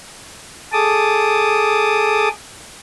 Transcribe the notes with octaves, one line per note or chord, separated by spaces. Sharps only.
G#4 A4 A5 D6 D#6